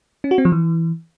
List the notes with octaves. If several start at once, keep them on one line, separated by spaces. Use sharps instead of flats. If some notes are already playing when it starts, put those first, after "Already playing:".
C#4
F#4
C4
F3
E3